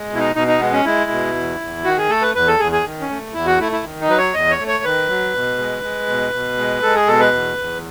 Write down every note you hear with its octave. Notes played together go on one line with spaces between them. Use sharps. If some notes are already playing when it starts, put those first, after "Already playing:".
Already playing: G#3
B2 E4
D#4
B2 D#4
D#4
G#3 B3
C#4
G#3 E4
B2
E2
E2
D#3 F#4
G#4
A3 A4
B4
E2 B4
A4
E2 G#4
G#4
D#3
C#4
A3
E2 E4
F#4
A3 E4
E4
D#3
D#4
F#3 B4
C#5
E2 D#5
C#5
A3
C#5
D#3 B4
F#3
B2
G#3
G#3
B2
B2
G#3
G#3 A4
G#4
B2 A4
B4
E2
E2